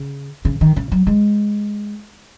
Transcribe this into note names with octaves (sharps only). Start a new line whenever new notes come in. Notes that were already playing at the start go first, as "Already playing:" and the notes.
Already playing: C#3
C#3
D#3
C#3
F#3
G#3